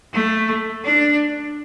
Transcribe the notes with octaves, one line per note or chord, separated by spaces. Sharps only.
A3
D4